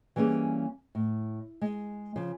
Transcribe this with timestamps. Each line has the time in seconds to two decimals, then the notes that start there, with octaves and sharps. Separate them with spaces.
0.16 E3 G3 A#3 C#4 G#4
0.95 A2
1.61 G#3
2.16 C#3 F3